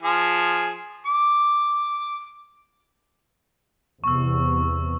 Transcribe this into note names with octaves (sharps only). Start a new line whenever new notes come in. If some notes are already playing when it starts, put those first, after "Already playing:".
F3 G#4
D6
E2 C3 C#6 E6